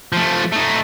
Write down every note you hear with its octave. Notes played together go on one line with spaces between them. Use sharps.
F3 A3
A3 D#4